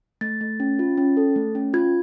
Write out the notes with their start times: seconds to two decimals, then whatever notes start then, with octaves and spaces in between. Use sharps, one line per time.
0.21 A3 A6
0.41 A3
0.60 C#4
0.79 F4
0.98 C#4
1.17 A4
1.36 A3
1.55 C#4
1.74 F4 G#6